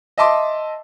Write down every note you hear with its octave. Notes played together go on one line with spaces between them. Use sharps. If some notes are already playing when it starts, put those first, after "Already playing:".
D#5 E5 A5 C6 D6